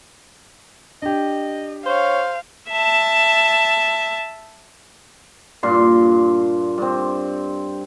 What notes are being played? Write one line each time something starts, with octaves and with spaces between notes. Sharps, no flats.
D4 G4 D#5
C5 C#5 F5
E5 A5
G2 A#2 C6
G2 C4